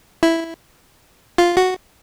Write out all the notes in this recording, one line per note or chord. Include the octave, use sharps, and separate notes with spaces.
E4
F4
F#4